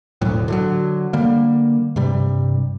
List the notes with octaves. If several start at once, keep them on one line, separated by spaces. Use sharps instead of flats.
E1 D2 A2 F#3
D3 E3 F#3
D3 G3 A#3
G2 C3 G3